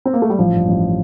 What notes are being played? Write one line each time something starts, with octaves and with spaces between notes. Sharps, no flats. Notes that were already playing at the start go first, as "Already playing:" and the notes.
C4
A#3
A3
G3
A1 F3
G2
A1